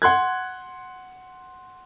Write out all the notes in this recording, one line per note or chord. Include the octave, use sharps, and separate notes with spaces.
F#5 C6 F#6 G#6